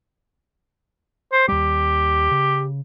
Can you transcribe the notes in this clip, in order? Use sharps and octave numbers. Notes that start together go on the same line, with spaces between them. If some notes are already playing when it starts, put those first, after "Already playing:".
C5
D#2 G3 G4
C#3